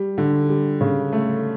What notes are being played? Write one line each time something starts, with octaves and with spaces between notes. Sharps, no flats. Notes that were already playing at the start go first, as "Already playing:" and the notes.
Already playing: G3
D3
G3
C#3
A3